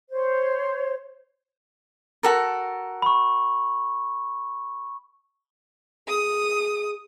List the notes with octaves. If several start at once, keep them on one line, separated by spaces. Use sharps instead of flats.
C5 C#5
F#4 A4 A#4
B5 C#6
G#4 D#6